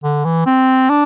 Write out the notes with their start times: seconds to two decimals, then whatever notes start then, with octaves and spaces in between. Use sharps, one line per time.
0.04 D3
0.25 E3
0.46 C4
0.90 D4